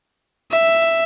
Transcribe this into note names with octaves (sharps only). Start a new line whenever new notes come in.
E5